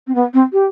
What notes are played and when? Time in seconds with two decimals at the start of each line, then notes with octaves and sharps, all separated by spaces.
0.07 C4
0.15 B3
0.33 C4
0.53 G4